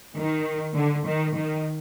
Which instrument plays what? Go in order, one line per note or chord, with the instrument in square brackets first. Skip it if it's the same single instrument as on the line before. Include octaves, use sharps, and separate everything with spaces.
[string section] D#3
D3
D#3
D#3